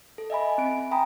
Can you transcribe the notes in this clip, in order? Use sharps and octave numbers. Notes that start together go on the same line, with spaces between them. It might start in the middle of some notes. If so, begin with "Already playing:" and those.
A4
D#5 E5 G#5 B5
C4 D7
G5 G#5 A#5 B5 D#6